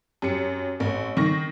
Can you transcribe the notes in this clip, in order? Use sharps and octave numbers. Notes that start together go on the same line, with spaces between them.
F#2 G4 C#7
A1
D#3 C#6 A#6